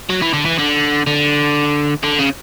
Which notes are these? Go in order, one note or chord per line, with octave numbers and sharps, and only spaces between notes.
F#3
E3
D3
E3
D3
D3
D3
C#3